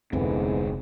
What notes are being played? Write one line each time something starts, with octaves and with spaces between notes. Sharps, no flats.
F1 D2 G#2 D3 E3 B3 C4